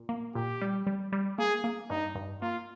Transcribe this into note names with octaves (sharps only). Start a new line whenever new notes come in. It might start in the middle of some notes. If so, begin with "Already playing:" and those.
Already playing: A#2
A#3
A#2 G4
G3
G3
G3
A#3 G#4
A#3
G2 D#4
G2
A#3 F4